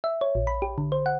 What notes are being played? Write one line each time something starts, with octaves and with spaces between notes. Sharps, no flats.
E5
C#5
A#1
B5
G4
D3
C5
F#5